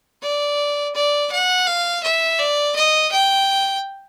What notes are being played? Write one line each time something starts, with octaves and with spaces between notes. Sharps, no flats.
D5
D5
F#5
F5
E5
D5
D#5
G5